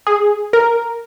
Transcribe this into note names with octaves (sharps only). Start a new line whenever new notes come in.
G#4
A#4